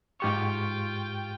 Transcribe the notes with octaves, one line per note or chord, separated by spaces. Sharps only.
G#2 F4 G4 G5 C#6